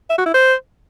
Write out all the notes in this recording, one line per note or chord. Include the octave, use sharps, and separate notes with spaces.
E5
F#4
E4
C5